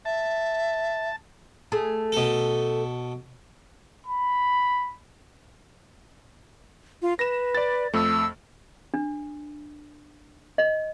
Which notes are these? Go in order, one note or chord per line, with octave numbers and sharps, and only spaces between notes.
E5 A5
A3 G#4
B2 A4
B5
F4
B4 A#6 E7
D5 A6
F2 A3 E6
D4
D#5